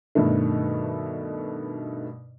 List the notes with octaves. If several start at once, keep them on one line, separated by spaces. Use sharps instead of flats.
G2 B2 D#3 A3